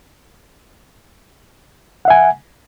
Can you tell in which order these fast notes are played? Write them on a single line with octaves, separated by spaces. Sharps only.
F#5 E5 G#5